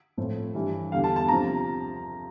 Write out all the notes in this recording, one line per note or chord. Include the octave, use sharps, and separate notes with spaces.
A2 F3 C4
G2 E3 G3 D4
E2 D3 G3 D4 F5
A5
A5
C3 F3 A#5